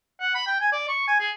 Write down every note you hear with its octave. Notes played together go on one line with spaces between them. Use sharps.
F#5
B5
G5
G#5
D5
C#6
G#5
G#4